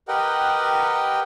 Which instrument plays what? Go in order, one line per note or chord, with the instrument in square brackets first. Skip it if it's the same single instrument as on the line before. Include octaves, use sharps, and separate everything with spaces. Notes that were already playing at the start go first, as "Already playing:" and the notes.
[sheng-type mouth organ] G4 A#4 B4 D#5 F#5 G5